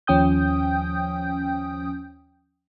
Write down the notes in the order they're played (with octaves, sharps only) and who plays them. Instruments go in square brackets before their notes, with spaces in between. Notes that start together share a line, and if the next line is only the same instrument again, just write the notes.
[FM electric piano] D#2 F3 C#4 G5 D#6 G6